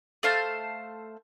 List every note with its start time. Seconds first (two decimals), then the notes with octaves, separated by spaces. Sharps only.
0.23 A3 C5 F5 A5